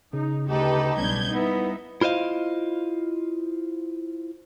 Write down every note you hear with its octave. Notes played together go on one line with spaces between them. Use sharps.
C#3 D#4
D2 D#4 G4 A4 B4
B1 G3 B3 C#4 D4 G6 G#6
A#3 B3 D#4 E4
E4 F4 C5 D#5 F5